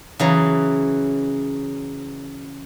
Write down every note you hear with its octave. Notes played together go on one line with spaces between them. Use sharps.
C#3 E3 F#3